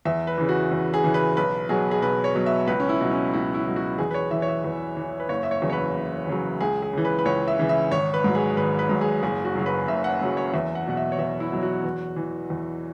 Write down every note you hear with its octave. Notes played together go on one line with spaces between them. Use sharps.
E2 E5
B4
C#3 E3
F#4
E2
G#4
C#3 E3
B4
B1 B4
B2 F#3 G#4
G#4
B1 B4
C#5
B2 F#3
E5
C#2 B4
C#4
E4
B2 F#3
C#4
C#2 E4
E4
B2 F#3
F#4
E2 G#4
B4
C#5
E3 E5
C#5
E5
E2
E3
B4
F#1 C#5
E5
C#5
E2 C#3 F#3
C#5
B4
F#1
E2 C#3 F#3
C#2 G#4
G#4
C#3 E3
B4
B4
C#2 C#5
E5
C#3 E3
E5
G#1 C#5
B4
G#2 F#3
G#4
G#1 B4
B4
G#2 F#3
G#4
F#1 G#4
F#4
F#2 C#3 F#3
B4
F#1 E5
F#5
F#2 C#3 F#3
C#5
E2 E5
F#5
B2 F#3 F#5
E5
C#5
E2 E5
E4
B2 F#3
F#4
E2
E3
E2